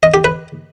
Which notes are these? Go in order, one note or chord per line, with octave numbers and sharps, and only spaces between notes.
D#5
G4
B4